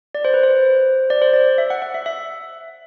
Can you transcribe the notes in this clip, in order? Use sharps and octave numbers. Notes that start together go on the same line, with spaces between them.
D5
C5
B4
C5
D5
C5
D5
E5
F#5
F#5
E5
E5